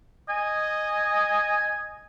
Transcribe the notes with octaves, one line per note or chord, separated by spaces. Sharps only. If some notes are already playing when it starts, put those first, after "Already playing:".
D#5 G#5